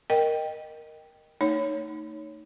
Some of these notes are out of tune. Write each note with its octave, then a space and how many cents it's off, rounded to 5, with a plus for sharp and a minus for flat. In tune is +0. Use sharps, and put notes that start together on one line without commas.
A#4 +0 D#5 -10 G5 +0
A3 +40 D#4 +0 C#5 +5